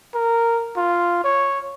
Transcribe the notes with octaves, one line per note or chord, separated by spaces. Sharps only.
A#4
F4
C#5